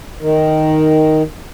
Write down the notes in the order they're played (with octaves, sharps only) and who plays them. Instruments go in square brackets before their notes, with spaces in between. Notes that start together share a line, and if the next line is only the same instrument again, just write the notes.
[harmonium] D#3